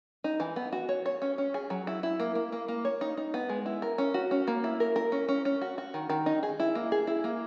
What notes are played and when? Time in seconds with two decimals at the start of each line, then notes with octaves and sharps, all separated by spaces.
0.24 D#4
0.40 E3
0.56 B3
0.73 F#4
0.89 C#5
1.06 C#5
1.22 C#4
1.38 C#4
1.54 G#4
1.70 F#3
1.87 E4
2.03 E4
2.20 A#3
2.35 A#3
2.52 A#3
2.68 A#3
2.85 C#5
3.01 D#4
3.17 D#4
3.34 B3
3.49 G#3
3.66 E4
3.82 A#4
3.98 C#4
4.14 F#4
4.31 C#4
4.48 A#3
4.64 E4
4.80 A#4
4.96 A#4
5.12 C#4
5.28 C#4
5.45 C#4
5.61 F#4
5.78 F#4
5.94 D#3
6.10 D#3
6.26 D#4
6.43 G#4
6.60 E4
6.75 A#3
6.92 G#4
7.07 E4
7.24 A#3